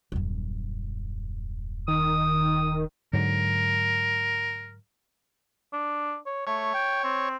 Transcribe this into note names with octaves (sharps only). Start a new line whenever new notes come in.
D#1 F#2
D#3 D#6
G#2 D3 F#3 A#4
D4
C#5
A3 C#5
G5
C4